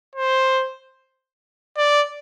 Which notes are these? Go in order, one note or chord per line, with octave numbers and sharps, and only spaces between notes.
C5
D5